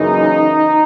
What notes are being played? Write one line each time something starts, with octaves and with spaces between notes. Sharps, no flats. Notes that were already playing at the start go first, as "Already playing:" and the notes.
Already playing: F#2 C#3 E3 A#3 D#4